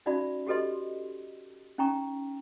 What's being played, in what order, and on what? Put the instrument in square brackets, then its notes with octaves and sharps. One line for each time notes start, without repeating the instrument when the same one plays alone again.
[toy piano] C#4 D#4 F#4 D5 E5 B5
F#4 G4 A4 B4 D#5 C6
C#4 D#4 G5 A#5 C#6